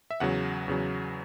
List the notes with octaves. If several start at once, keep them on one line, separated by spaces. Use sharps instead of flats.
E5
E2 C#3 F#3 F#5
E2 C#3 F#3